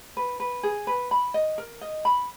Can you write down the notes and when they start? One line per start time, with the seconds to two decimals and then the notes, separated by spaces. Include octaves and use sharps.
0.17 B4
0.40 B4
0.63 G#4
0.87 B4
1.11 B5
1.34 D#5
1.58 A#4
1.81 D#5
2.05 B5